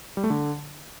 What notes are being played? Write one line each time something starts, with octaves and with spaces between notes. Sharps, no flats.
G3
A3
D3